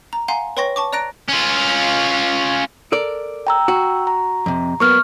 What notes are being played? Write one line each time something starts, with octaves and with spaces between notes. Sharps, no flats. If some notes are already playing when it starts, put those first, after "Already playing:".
A#5
F5 F#5 G#5 A#5 C6
B4 C#5 G5 C6 C#6 A#6
A5 C#6 D6
D5 A#5 F#6 A#6 D7
C#4 F4
A4 A#4 D5
G5 A#5 E6
F#4
A#5
F2 C3
F#3 A#3 B3 C#6 F6